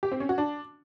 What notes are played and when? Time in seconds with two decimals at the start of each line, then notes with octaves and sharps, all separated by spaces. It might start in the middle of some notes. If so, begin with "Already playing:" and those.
0.03 G4
0.12 C4
0.20 C#4
0.29 F#4
0.38 D4